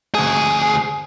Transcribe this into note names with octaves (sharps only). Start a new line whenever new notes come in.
D2 G#4